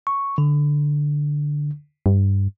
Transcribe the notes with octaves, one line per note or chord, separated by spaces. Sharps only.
C#6
D3
G2